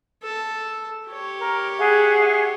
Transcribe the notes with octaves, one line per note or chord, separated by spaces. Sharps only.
A4
G4 C#5
A#4
G#4 E5 F#5